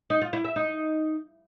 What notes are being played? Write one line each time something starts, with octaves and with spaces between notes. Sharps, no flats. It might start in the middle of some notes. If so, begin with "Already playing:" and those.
D#4
F4
E4
E5
D#4